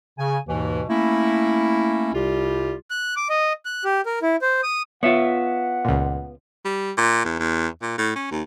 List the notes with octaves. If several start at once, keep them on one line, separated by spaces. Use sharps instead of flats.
C#3 G#5
D#2 G#2 B2 E3
A3 A#3 C#4 E4
C2 C3 G3 F4 G4
F#6
D6
D#5
F#6
G4
A#4
E4
C5
D#6
B3 F4 C#5 E5 F#5
C#2 A#2
G3
A#2
E2
E2
A#2
A2
C#4
D#2